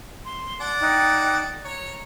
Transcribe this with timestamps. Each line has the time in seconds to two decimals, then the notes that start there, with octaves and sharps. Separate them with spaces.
0.25 C6
0.61 D5 F#5 A5
0.80 D#4 G5 F#6
1.65 C#5 A#5